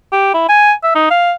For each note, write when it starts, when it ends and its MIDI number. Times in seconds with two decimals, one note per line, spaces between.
0.13 0.32 67
0.34 0.45 64
0.49 0.72 80
0.83 0.91 76
0.95 1.10 63
1.11 1.33 77